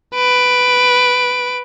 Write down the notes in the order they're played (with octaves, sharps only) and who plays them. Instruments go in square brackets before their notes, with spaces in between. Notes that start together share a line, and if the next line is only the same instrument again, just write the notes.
[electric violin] B4 D7